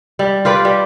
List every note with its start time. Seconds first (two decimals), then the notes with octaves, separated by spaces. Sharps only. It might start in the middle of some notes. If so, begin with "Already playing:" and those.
0.19 G3
0.45 F4 G4 B4 D5
0.65 G3